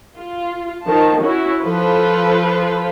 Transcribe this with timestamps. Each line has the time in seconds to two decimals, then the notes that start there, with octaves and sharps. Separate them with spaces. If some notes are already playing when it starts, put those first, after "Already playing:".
0.17 F4
0.87 D#3 F3 A5
1.24 C#4 E4 F#4
1.61 F3 F4 A4 B4 C5